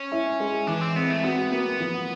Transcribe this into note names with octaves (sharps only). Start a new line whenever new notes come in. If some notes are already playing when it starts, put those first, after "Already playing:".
Already playing: C#4
E4
G#3
E3 D4
C4
B3 C4
A3
B3 F#4
A#3
F3